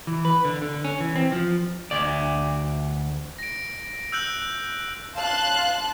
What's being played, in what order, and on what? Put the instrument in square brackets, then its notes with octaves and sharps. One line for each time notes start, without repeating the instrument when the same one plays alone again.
[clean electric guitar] E3
B4
D3
D3
C#4
E3
C4
F3
D2 D5
[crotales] A#6 D7
E6 F#6 G6 D7 F#7
[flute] F5 [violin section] A5 C6 F#6